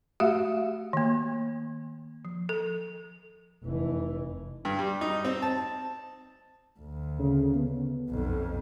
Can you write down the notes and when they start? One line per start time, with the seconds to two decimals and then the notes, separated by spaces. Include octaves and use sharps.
0.20 A3 F#4 G4 E5 F5
0.93 D#3 A#3
2.25 F3
2.49 A4
3.64 F1 E3
4.65 G2
4.79 G3
5.01 D#4
5.24 C4
5.42 A5
6.80 D2
7.19 C#3
7.56 B3
8.09 B1 F2